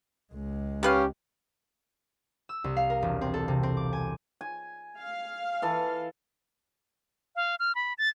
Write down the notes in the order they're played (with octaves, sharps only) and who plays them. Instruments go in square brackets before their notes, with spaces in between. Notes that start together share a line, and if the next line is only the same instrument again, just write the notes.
[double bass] C#2 G#3
[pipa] D#3 B4 F5 [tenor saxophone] C#4 [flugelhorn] G4
[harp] E6
C2
F5
A#4
E1
C4
A4
C3
C4
D6
G#5
[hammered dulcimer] G#5
[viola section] F5
[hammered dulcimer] E3 A4
[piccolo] F5
F6
B5
A6